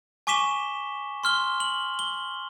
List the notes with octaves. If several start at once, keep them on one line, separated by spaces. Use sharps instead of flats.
G#5 C#6 D6 B6 E7 G7
C6 F6 G7
F#7
G7